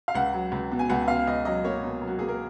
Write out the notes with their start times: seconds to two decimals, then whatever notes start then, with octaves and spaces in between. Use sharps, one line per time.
0.08 F5
0.15 C#2 F#5
0.34 F#3
0.52 C#2
0.72 B2
0.79 G#5
0.89 C#2 F#5
1.08 B2 F5
1.27 C#2 D#5
1.45 F#3 D#5
1.64 A#3 C#5
1.83 B2
2.01 F#3
2.07 F#4
2.19 A#3 G#4
2.29 A#4